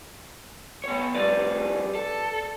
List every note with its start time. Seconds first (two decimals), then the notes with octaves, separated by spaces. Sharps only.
0.84 B3 C#5
1.15 F2 G3 B4 D5
1.95 A4